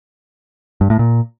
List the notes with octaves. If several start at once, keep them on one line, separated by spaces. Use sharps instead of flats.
G2
A2
A#2